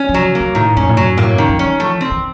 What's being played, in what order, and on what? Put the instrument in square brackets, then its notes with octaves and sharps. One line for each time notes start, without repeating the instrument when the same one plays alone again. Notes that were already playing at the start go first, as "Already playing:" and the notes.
Already playing: [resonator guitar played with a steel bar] C#4
[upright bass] F3
[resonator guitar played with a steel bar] F#3
[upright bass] C#3
[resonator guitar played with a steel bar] A#3
[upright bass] F#2
[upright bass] A2 [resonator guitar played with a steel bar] D#3
[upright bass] F2 [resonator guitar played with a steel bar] C#4
[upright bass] A2
[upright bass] F#2 [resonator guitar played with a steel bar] F#3
[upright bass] A2 [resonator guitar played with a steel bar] A#3
[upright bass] F#2 [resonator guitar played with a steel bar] D#3
[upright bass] F3
[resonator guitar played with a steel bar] C#4
[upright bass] F#3
[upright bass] F3 [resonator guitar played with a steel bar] A3
[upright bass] D#3
[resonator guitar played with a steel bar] C4
[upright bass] D#3